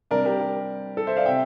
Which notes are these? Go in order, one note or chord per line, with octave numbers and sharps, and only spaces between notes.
C3 G3 D4 A#4 D5
G4 A#4
G4
A4
C5 E5
D5 F5
C3 E5 G5